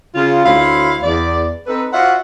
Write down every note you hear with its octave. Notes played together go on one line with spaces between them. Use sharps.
C#3 F4
D2 E4 C5 C#5 F5
E2 D5
C4 D#4 A4 B4
F4 F#4 C5 D5 E5 F#5